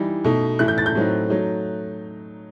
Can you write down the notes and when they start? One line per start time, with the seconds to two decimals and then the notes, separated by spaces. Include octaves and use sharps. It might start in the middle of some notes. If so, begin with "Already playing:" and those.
Already playing: E3 G3 D#4
0.24 B2 A3 D#4
0.59 A2 E3 A3 E4 F#6
0.68 G6
0.78 A6
0.86 G6
0.95 A2 F#3 A3 C4 D#4
1.30 F#3 A3 D#4